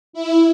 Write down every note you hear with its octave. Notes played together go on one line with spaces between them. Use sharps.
E4